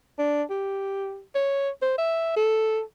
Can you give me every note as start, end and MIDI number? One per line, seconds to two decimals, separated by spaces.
0.18 0.43 62
0.50 1.22 67
1.35 1.70 73
1.82 1.96 72
1.98 2.35 76
2.36 2.81 69